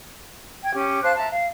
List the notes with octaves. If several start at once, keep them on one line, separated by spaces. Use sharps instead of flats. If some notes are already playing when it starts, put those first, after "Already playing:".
G5 G#6
C#4 G4
C5 F5 A5 F#6
E5 A5 A#5
F5